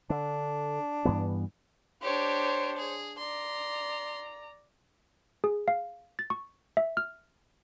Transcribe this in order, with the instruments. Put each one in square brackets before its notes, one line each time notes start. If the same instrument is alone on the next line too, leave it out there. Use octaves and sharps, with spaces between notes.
[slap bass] D3 [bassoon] D4
[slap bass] G2 E3 B3
[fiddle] D4 G4 [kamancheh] C5 C#5
[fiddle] G#4
[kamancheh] D5 A#5 [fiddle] C6
[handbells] G#4
F5
A6
C#6
E5
F6